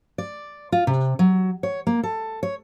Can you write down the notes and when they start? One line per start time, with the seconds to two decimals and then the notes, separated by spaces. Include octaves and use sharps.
0.18 D5
0.72 F4
0.87 C3
1.19 F#3
1.63 C#5
1.87 A#3
2.03 A4
2.43 C#5